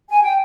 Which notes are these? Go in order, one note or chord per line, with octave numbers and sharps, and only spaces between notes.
G#5
G5